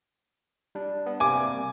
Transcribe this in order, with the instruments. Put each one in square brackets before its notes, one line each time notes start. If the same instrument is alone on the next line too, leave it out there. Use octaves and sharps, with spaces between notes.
[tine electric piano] G3 D4
B3
[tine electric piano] C3 G3 A#3 [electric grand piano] G#5 D6